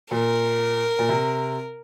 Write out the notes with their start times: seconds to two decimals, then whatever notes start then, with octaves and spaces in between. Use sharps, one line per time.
0.11 A#2 A#4
0.99 A#2
1.09 C3